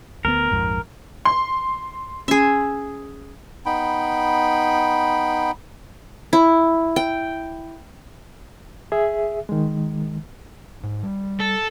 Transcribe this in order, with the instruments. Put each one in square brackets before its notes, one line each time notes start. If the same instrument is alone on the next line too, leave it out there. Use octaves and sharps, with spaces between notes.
[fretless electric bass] D2 F#3 B3 [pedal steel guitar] A#4
[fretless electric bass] A#1 F2 G#2
[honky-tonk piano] C6
[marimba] C#4 [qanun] G#4 E5
[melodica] B3 D#4 G5 B5
[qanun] E4
G5
[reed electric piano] G#4 E5
D#3 G#3
[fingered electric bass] G#2
G3
[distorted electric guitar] A4